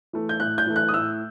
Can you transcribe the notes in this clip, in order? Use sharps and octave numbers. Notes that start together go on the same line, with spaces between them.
E3 A3
G6
A2 F#6
G6
E3 A3
F#6
D#6
A2 E6